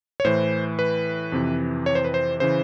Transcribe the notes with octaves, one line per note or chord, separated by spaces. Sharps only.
C#5
A2 E3 C5
B4
F2 C3 E3
C#5
C5
B4
C5
C#3 E3 C5